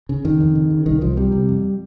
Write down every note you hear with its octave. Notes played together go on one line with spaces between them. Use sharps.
C#3
F2 D#3
F2
C#3
C#3
C2 D#3
C2 F3
C3 G3
C3
F2